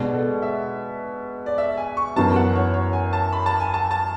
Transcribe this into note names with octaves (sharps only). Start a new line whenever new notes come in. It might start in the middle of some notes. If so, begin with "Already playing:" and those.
Already playing: B2 G#3 D4
A4
E5
D5
E5
G#5
C#6
F#2 E3 B3 F#4 A5
F#5
C#5
C#5
G#5
A5
B5
A5
G#5
A5
A5